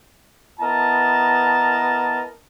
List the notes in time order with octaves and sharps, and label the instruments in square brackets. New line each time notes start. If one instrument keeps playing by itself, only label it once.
[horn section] B3 E4 A#4 D#5 A5 A#5